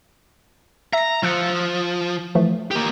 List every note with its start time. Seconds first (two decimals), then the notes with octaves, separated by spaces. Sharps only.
0.93 E5 A#5 A#6
1.23 F3 E6 F#6 C#7
2.35 E3 F3 A3
2.71 A#3 G4